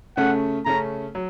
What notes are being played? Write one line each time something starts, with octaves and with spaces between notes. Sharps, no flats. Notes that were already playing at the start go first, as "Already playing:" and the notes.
C#3 A3 C#4 F#5
C#3 A3 C#4 A#5
F#3